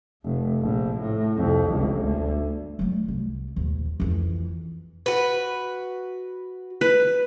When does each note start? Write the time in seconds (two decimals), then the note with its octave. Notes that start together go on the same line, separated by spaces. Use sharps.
0.23 F1
0.62 A#1
1.01 A2
1.37 C2 F2
1.69 G1 C#2
2.02 D2
2.79 F#3 A3
3.08 C2
3.56 D#1 D#2
4.00 F2 E3
5.06 F#4 B4
6.81 B4